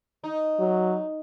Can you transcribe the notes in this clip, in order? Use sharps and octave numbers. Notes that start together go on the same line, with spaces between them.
D#4
F#3